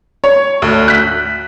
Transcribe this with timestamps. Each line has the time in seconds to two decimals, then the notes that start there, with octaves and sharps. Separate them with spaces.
0.24 C#5
0.62 D2
0.88 F#6 B6